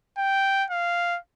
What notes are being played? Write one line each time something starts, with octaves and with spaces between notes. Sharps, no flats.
G5
F5